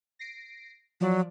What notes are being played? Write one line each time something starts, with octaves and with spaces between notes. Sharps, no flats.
A#6 C7 D7
F3 F#3 D5